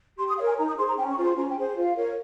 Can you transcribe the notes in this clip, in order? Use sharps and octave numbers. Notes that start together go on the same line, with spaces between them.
G4 C6
D#6
A#4 C#5 F5
G#5
D#4 A#5
D#6
G#4 C5 C6
A#5
C#4 G5
C#6
F4 G#4 C5
C6
C#4 A#5
G5
G#4 C5
F4 F5
A#4 C#5